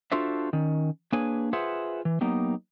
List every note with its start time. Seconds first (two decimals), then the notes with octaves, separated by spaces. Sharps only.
0.12 D4 F4 F#4 A4 C5 E5
0.53 D#3 C#4
1.12 A#3 D4 G#4 B4 C#5 G#5
1.53 F4 G#4 B4 C5 E5 F#5
2.05 E3
2.21 F#3 A#3 B3 D#4 G4